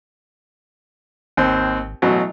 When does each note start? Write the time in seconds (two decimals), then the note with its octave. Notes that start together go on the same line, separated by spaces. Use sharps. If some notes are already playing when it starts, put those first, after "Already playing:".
1.37 G#1 D#2 C4
2.02 A1 B2 F#3